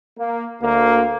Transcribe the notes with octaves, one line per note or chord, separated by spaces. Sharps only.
A#3
D2 A#3